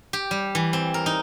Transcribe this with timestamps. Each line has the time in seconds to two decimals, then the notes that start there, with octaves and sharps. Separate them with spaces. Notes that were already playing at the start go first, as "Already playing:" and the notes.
0.13 G4
0.31 G3
0.55 E3
0.73 C4
0.94 A#4
1.06 D#4